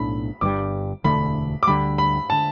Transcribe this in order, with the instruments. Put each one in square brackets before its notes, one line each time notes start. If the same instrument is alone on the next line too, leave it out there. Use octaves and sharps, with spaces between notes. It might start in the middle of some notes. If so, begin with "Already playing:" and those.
Already playing: [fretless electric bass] B1 A2 D4 [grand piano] B5
[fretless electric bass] G1 G2 G3 [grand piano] D6
[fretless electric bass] E1 D2 D3 A3 [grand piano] B5
[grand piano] D6
[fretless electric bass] D2 D3 G3 [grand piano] B5
[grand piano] B5
[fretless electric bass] D3 [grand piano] A5